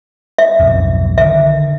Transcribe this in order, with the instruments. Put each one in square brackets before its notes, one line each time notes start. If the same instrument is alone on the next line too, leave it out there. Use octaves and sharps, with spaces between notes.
[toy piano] E5
[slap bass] B1 F2 G#2
[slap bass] D3 D#3 [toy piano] E5